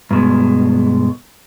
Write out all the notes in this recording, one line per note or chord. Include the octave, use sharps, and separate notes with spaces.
G2 B2 G#3